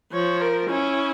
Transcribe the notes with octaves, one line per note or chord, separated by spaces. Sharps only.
F3 C#5
A#4
C#4 E4